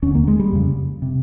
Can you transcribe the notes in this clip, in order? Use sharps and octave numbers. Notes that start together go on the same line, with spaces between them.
D#2 D3 C#4
A#3
G#3
G3
F2 C#3
C3